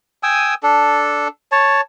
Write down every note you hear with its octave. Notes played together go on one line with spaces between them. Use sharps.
G5 G#5 D#6 E6
D4 A4
C#5 A5